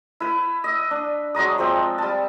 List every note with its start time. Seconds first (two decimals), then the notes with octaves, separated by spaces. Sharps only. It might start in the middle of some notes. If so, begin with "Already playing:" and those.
0.20 E4 B4
0.64 D#5 E5
0.91 D4
1.35 F#3 G#3 A#5 D#6
1.58 F3 G#3 C4 G5
1.98 G3 A5